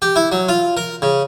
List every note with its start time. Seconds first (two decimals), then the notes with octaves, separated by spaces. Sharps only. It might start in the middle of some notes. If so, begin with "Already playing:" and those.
0.02 G4
0.16 E4
0.32 F#3
0.49 F4
0.77 A#4
1.02 C#3